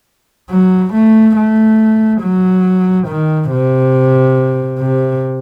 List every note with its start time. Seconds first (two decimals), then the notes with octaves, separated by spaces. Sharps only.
0.50 F#3
0.93 A3
1.36 A3
2.22 F#3
3.08 D#3
3.51 C3
4.79 C3